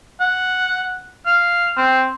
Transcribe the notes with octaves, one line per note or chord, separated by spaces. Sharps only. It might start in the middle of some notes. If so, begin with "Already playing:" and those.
F#5
F5
C4